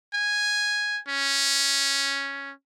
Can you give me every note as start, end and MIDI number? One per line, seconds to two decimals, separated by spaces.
0.14 0.99 80
1.08 2.52 61